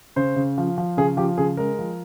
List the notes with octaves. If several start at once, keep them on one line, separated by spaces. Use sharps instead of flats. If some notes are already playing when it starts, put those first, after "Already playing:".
C#3 C5
C#3
F3
F3
C#3 G#4
F3 G4
C#3 G#4
G#3 A#4
F3